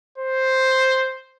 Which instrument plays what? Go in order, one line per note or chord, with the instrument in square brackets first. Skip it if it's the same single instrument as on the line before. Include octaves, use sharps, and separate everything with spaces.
[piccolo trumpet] C5